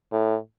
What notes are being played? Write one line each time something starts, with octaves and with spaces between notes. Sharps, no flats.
A2